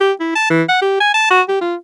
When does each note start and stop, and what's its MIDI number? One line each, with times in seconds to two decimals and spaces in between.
0.01 0.12 67
0.20 0.30 64
0.35 0.45 81
0.50 0.63 52
0.69 0.81 78
0.82 0.96 67
1.00 1.11 80
1.14 1.27 81
1.31 1.42 66
1.48 1.58 67
1.61 1.75 65